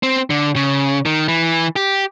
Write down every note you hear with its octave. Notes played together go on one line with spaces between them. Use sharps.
C4
D3
C#3
D#3
E3
G4